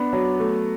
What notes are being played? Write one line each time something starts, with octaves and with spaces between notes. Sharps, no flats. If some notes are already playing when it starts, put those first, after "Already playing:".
Already playing: B3 D4
F#3
A3